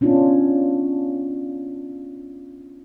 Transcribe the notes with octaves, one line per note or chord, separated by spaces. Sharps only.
B3 C#4 D4 F4